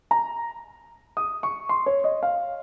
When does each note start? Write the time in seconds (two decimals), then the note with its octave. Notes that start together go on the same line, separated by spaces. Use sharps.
0.11 A#5
1.17 D#6
1.43 C#6
1.69 C6
1.86 C#5
2.04 D#5
2.23 F5